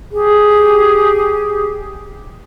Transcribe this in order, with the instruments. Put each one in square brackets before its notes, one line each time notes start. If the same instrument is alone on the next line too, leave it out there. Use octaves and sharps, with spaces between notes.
[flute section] G4 G#4